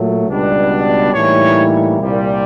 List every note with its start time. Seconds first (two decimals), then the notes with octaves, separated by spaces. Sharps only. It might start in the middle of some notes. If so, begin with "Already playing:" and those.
Already playing: A#2 F#3 A3
0.28 C#2 B2 G3 B3 D4
1.13 A2 E3 G3 A#3 D#4 C#5
2.00 C2 A#2 G3